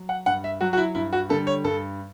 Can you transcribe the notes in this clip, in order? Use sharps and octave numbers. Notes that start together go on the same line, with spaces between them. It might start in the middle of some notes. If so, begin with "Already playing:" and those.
Already playing: F#3
F#5
G2 F#5
E5
F#3 F#4
F#4
E4
G2 E4
F#4
D3 G3 A4
C#5
G2 A4